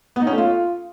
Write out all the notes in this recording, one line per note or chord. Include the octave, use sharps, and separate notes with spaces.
B3
D#4
C#4
A3
F4